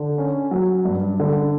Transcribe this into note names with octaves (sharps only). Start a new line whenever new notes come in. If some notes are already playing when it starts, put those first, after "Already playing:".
Already playing: D3
C#4
F#3
G2
D3